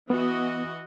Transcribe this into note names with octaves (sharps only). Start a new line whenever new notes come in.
E3 B3 F#4 D#5